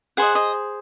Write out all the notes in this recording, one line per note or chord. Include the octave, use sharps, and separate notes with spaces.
G#4 C5 D#5 F#5
D#5